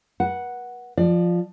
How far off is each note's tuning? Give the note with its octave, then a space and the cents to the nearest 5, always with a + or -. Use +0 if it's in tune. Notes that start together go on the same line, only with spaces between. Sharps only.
B4 -40 F#5 +0
F3 +0 D5 +25